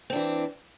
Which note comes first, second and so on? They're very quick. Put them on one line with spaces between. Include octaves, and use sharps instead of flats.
C4 D4 E3